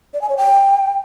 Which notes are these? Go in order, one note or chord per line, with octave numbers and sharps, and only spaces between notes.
D5
G#5
C#5
G5